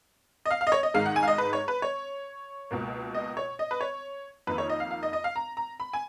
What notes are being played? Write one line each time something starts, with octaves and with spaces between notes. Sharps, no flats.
D#5
F5
F5
D#5
C#5
D#5
G#2 D#3 G#3 D#4 F5
F#5
G#5
F5
D#5
B4
C#5
B4
C#5
C#2 B2 A#3
D#5
C#5
D#5
B4
C#5
F2 D#3 A#3 D#4 B4
C#5
D#5
F5
F5
D#5
D#5
F5
A#5
A#5
B5
G#5